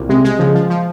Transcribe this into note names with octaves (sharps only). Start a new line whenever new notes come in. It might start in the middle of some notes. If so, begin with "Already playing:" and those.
Already playing: C2 A#2
C3 G#3
G#3
C#3 F3
F3
F3